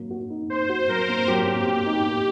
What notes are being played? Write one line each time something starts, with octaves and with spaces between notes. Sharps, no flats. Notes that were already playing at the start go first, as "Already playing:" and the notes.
Already playing: F#3 A#3
F#4
D#4
D#4 C5
F#4
F#3 A#4
A#3
F#3 G4
A#3
A#3 G4
D#4
A#3